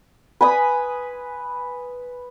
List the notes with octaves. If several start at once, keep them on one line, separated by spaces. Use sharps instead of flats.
B4 G#5 B5 D#6